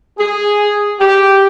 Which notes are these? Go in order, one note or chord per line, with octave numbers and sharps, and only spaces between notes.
G#4
G4